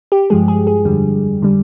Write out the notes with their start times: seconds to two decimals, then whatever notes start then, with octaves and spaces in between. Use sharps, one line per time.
0.12 G4
0.30 G2 F3 G#3 G#4
0.48 G#4
0.67 G#4
0.85 F2 D3 G3
1.42 D3 G3